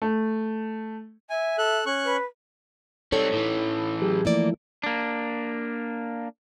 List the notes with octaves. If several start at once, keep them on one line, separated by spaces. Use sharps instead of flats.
A3
E5 G#5
A4 F#6
C#4 C#6 F#6
B4
G3 C4 D#4 A4 C#5
A2 E3
F#3 G4 G#4
E3 F3 A3 A#3 E4 D5
A#3 D4